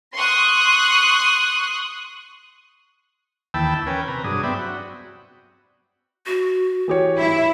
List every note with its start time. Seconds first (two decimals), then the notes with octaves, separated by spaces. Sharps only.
0.14 C6 C#6 D#6 F#6
3.54 D#2 E3 G5 A5 B5 E6
3.87 C#4 A#4 B4 G5 G#5
4.08 C3 B4 A#5
4.24 G2 F#3 D4 G#4 D#6
4.43 B3 C4 D5 E5 G5 B5
4.59 F#4
6.26 F#4
6.88 E3 G4 C#5
7.17 E4 E5